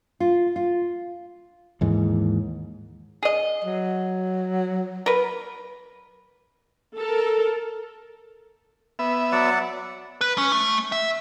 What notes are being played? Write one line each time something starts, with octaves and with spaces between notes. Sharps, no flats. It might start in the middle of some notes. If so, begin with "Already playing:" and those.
F4
F4
D#2 G#2 E3
G#4 D#5
F#3
A#4 B4
A4 A#4
B3 E5
F#3 D5 F#5
B4
C#4
A3
E5